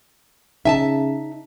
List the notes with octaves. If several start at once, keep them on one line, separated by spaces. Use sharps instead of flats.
C#3 D#4 E5 G#5 A5